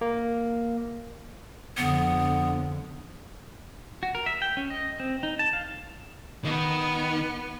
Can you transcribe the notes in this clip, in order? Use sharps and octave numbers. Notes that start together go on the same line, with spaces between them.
A#3
F2 D3 F3 B3
F#4
A#4
E5
G5
C#4
D#5
C4
D#4
A5
F5
D#3 B3